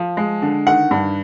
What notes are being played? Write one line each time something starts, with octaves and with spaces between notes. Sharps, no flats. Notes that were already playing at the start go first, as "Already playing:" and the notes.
Already playing: F3
G#3
D3
D#3 F#5
G2